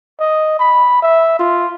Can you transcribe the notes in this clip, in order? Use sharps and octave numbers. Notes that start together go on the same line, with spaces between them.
D#5
B5
E5
F4